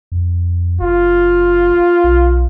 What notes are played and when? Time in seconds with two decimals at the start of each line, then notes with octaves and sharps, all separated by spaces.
0.12 F2
0.81 F#1 F4
2.04 B1